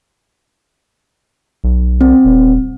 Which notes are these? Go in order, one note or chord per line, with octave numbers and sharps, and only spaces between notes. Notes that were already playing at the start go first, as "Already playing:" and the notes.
B1
C4
D#1